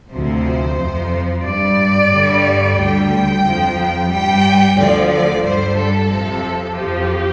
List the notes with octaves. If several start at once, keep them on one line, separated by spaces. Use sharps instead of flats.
D2 C3 F3 C5
F2 F3
G2 G3 D5
G2 D3 G3
D2 D3 G3 G5
F2 F3
G2 G3 G5
D2 D3 F3 D5
D5
G2 D3 G3 C5
A4
F2 C3 F3
F2 F3 G4